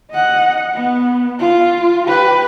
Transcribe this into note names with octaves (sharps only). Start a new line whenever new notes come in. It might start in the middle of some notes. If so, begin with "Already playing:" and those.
D#5 F#5
B3
F4
G4 B4